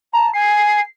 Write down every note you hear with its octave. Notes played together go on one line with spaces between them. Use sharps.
A5 A#5
G#5 C7